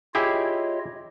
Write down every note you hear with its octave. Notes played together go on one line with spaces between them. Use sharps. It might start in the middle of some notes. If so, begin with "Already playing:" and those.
E4 F4 G4 G#4 C#5 D#5